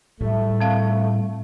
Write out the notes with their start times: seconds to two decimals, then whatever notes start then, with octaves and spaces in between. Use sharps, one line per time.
0.21 A2 G3 A3
0.61 C4 F5